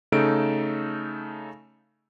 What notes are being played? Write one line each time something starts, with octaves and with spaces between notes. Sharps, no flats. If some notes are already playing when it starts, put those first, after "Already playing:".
C#3 A3 D#4 A4 D7